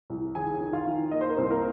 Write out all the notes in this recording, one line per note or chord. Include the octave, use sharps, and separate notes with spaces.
C2
D#2 G#4 G#5
D#3
F4 F5
D#3
A#3 D#5
C5
A#4
C2 C4 C5
A#3 A#4